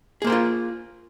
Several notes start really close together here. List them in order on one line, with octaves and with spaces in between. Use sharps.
G#4 A#3 C5 A#4 F4